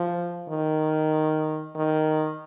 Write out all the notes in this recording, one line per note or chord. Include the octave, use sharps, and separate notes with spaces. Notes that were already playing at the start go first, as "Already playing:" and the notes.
Already playing: F3
D#3
D#3